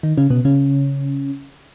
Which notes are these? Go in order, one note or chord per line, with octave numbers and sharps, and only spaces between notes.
D#3 D#4
C#3 C#4
B2 B3
C#3 C#4